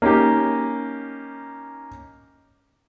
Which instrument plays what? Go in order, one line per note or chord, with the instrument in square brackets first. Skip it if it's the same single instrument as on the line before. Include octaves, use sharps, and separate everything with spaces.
[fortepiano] A#3 C#4 D#4 G4